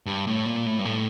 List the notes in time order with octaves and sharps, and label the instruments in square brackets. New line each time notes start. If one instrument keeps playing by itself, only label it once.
[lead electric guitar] G2
A2
A#2
A2
G2
A2